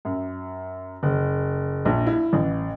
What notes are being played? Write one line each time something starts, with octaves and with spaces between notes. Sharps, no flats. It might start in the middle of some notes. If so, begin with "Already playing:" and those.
F#2
F#1
A#1
E4
A1